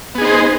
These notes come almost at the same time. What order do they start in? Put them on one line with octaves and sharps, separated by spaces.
B3 G#4 D#4 C5